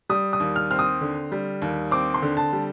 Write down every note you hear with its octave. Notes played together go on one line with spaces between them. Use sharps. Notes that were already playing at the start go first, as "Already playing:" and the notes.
G3 D#6
D#6
D#2
F6
C4 F6
D#6
D3
G3
D#2
C4 D6
C6
D3
A5
G3